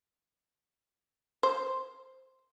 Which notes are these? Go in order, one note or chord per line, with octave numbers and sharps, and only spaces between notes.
C5